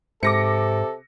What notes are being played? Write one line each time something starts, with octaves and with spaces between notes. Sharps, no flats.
G#2 C3 A4 D6 A#6 C#7